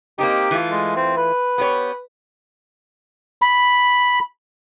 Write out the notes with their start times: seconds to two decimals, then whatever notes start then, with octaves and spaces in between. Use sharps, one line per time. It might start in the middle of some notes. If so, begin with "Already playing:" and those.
0.18 A#3 C4 D#4 G4
0.51 E3 A3 F4
0.71 G#3
0.96 C4
1.17 B4
1.58 B3 G4 C#5
3.42 B5